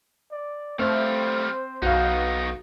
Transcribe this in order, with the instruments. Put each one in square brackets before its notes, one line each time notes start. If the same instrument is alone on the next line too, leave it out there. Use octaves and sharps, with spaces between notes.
[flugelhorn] D5
[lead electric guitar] G3 F5 [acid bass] A3 [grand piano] C4 [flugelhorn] C5
[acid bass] B1 [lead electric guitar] B3 D#4 [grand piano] F#4 F5